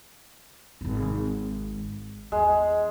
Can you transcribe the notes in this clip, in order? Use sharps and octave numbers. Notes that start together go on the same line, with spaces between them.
D1 G#1
E2 G#3